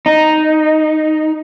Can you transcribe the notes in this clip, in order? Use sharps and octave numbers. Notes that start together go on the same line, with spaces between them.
D#4